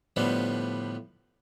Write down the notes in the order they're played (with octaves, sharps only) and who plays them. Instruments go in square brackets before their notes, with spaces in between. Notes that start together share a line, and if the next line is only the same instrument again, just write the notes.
[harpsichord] A2 D3 F3 G3 B3